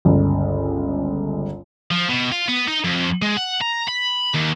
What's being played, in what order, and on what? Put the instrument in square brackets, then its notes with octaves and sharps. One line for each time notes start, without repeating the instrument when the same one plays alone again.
[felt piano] G1 C#2
[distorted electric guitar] F3
B2
F4
B3
D#4
F2
G#3
F#5
A#5
B5
D#2